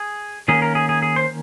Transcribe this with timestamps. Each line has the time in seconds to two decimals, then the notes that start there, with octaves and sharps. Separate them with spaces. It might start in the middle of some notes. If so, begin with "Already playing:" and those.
Already playing: G#4
0.48 D#3 A#3 C#4 G#4
0.62 A#4
0.75 G#4
0.89 G#4
1.02 G#4
1.16 C5